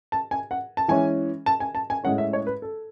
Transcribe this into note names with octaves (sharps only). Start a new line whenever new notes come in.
A5
G#5
F#5
A5
E3 G#3 C#4 G#5
A5
G#5
A5
G#5
A2 G#3 C#4 F#5
E5
C#5
B4
A4